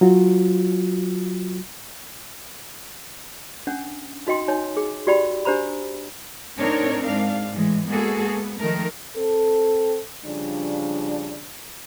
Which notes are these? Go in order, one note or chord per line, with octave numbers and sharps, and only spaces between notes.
F#3 F4 F#4
C#4 D4 F#5
D#4 F#4 D#5 G5 C6
D#4 C#5 G#5
G#4
F#4 G4 D5 G5 B5
D4 G4 C5 A#5 B5
A2 C4 D4 D#4 A#4 C#5
G#2 D4 F5
A2 E3 G#3
G#3 A#3 B3 F#4 G#4 A4
B3
D#3 F3 A3 A#4
C4 A4
C#3 F3 G3 D4